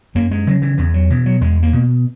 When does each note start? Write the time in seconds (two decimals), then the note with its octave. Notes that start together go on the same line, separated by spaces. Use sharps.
0.15 F#2 A#3
0.31 G#3
0.47 C#3 F#3
0.62 E3
0.78 E2 E3
0.94 F#3
1.10 B2 E3
1.26 F#3
1.41 E2 G#3
1.63 A#3
1.73 B2